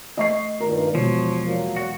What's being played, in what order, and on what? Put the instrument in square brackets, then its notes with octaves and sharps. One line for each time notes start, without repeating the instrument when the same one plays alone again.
[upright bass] A3 [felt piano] D#5 C#6 C7
[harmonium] G2 A#2 D#3 [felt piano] A#4
[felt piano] E1 [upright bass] B2 [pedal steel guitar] F3 [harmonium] C#5
[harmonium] A#2 F#3 A#3
[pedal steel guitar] F#4